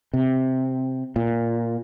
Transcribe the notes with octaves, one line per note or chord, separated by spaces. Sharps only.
C3
A#2